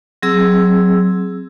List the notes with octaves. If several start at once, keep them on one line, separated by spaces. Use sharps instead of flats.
F#3 C4 G#4 E6